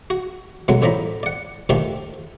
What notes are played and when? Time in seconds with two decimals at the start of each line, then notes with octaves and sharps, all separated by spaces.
0.10 F#4
0.68 B2 D3 F#3 G#3
0.82 A1 A2 F3 D5 A#5 B5
1.23 D5 F#5
1.69 D3 D#3 F3 A3 D4 G4